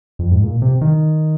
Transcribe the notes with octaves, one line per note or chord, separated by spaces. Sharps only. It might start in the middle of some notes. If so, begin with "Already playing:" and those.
F2
G#2
A#2
C3
D#3